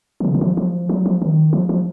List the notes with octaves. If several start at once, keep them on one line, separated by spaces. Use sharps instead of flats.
D#3
C#3
D#3
F3
F3
F#3
F3
D#3
F3
F3